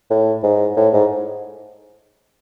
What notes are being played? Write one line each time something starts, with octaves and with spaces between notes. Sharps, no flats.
A2
G#2
A2
G#2